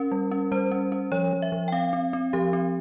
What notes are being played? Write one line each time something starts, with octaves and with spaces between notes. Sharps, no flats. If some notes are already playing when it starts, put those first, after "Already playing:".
Already playing: C#4 A#4
G3
C#4
G3 C5
C#4
C#4
F3 C#5
F3
E5
F3
G5
C4 F5
C4
C4
F3 G4
C4